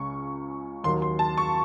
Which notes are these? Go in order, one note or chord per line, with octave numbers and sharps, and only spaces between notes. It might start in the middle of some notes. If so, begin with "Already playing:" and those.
Already playing: C#2 C#3 C#6
D#2 D#3 F#3 C6
C6
A5
C#6